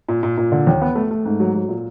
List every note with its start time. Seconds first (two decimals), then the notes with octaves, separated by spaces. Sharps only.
0.09 A#2
0.23 A#2
0.38 A#2
0.52 D3
0.67 D#2
0.82 B3
0.95 A3
1.11 A3
1.25 G#2
1.40 F#3
1.55 F#3
1.69 A#2